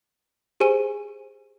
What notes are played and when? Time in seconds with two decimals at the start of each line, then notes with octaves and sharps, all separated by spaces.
0.60 G4 G#4 C5 G#5 D#7